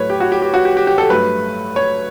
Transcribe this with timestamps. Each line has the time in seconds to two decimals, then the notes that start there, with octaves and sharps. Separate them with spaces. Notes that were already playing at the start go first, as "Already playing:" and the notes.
Already playing: A2 F#3 A3 B4 C#5
0.10 G4
0.20 F#4
0.32 G4
0.42 G4
0.54 F#4
0.65 G4
0.77 G4
0.87 G4
0.98 A4
1.09 G2 F#3 A3 B4
1.76 C#5